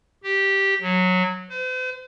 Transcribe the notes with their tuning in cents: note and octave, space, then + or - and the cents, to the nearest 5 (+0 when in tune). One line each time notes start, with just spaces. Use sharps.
G4 -5
F#3 -15
C5 -45